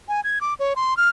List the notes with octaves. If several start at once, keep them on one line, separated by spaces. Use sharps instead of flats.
G#5
G#6
D6
C#5
C6
F6